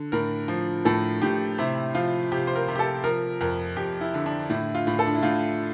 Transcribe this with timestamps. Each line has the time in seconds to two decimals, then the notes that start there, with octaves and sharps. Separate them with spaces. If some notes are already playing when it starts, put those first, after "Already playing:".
Already playing: D3
0.12 A2 A#4
0.48 F3
0.85 A2 A4
1.22 A2 G4
1.58 C3 E4
1.95 F3 F4
2.32 C3 G4
2.47 C5
2.55 A#4
2.68 C3
2.76 G4
2.79 A4
3.04 F3 A#4
3.41 F2 A#4
3.77 F2 G4
4.01 E4
4.14 D3
4.26 D4
4.50 A2 E4
4.75 F4
4.87 A2
4.99 A4
5.07 D4
5.15 E4
5.23 A2 F4